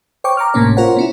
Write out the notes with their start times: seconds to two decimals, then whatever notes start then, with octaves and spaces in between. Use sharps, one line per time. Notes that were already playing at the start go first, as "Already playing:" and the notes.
0.24 C5 C#5 G5 C#6 D6
0.37 A#5 D6 F6
0.54 G1 A2 C3 A#3 C#4 C#5
0.77 F4 A#4 C5 C#5 F#5
0.97 B3 C#4 E4